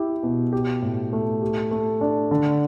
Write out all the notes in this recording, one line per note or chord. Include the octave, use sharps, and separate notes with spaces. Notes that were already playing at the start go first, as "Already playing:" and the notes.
Already playing: E4 G4
B2
G4
A2
A3
G4
A3
D4
D3